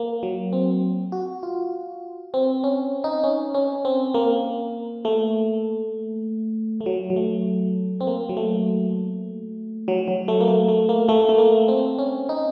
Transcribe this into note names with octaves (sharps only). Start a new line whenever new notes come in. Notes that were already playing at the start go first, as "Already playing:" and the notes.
Already playing: A#3
F#3
C4
F#4
F4
C4
C#4
D#4
C#4
C#4
C4
A#3
A3
A3
F#3
F#3
A3
C4
A#3
F#3
A3
F#3
F#3
A3
A#3
A3
A3
A#3
A3
A3
A#3
C4
C#4
D#4